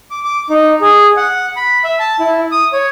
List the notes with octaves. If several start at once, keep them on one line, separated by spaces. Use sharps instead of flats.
D6
D6
D#4
G#4
F#5
B5
E5
A5
E4
D#6
C#5